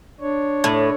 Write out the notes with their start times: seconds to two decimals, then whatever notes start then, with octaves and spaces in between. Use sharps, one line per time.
0.20 D4 C#5
0.64 A2